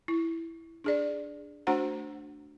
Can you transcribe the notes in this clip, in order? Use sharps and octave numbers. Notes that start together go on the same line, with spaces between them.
E4
D4 G#4 D5
A3 D4 F#4 C5 F#5 A#5